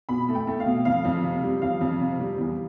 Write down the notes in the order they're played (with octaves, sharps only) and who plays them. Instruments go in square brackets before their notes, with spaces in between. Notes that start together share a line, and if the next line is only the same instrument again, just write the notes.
[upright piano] B2 B5
A3
G5
A3
F5
B2
F2 F5
F2
C3
G3
F2 F5
F2
C3
G3
E2